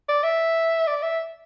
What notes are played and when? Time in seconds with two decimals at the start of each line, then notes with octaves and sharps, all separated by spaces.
0.09 D5
0.24 E5
0.87 D5
1.03 E5